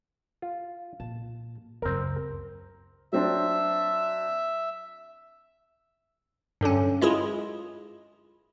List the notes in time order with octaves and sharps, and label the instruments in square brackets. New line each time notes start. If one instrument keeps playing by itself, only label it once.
[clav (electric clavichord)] F4
[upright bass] A#2 [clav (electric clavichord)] A5
[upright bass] C#2 F#2 [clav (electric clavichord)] C4 A#4
[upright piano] F#3 C4 D4 [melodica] E5
[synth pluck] G2 D3 F#3 C#4
G#3 E4 F4 G#4